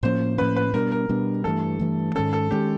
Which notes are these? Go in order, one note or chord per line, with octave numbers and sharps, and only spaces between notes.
A2 F3 A#3 C#4 C5
A2 F3 A#3 C#4 B4
B4
B2 G3 B3 D4 A#4
A#4
B2 G3 B3 D4
G2 E3 A3 A4
G2 E3 A3
G#2 D#3 G#3 C#4 A4
A4
D#3 G#3 C#4 G4